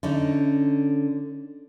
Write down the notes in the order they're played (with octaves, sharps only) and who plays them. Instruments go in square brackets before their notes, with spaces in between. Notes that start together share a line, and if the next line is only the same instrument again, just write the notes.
[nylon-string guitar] D3 C#4 D#4